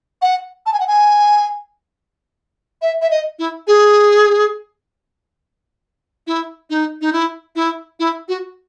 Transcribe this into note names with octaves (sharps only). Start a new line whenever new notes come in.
F#5
A5
G#5
F#5
G#5
E5
E5
D#5
E4
G#4
E4
D#4
D#4
E4
E4
E4
F#4